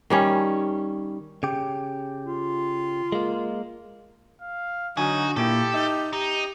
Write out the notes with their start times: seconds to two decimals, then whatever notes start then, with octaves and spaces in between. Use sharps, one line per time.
0.10 D#3 G3 C#4
1.43 C#3 G4
2.25 F4
3.12 G#3 A#3
4.41 F5
4.97 D3 F#3 D#4 F#4 G#5
5.36 A#2 A#3 E4 G4 A4 G5
5.74 D#4 E5
6.13 D#4 G4